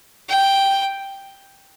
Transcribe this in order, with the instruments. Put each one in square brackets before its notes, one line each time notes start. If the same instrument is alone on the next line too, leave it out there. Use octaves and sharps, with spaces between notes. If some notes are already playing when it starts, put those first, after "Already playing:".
[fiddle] G5